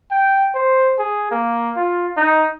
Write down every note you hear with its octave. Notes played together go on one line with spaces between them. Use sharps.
G5
C5
G#4
A#3
F4
D#4